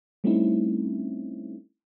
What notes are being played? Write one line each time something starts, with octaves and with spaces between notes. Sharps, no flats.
G3 A3 C4 C#4 D#4 E4